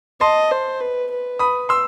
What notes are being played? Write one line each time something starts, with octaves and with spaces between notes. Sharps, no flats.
D#5 A5 C6
C5
B4
B4
B5 D#6
C6 E6